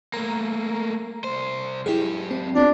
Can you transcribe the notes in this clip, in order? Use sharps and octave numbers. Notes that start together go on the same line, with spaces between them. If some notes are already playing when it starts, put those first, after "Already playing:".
A3 A#3 A#5
C2 C5
F#2 E4 G4 G#4
C4
B3 C4 D4 F4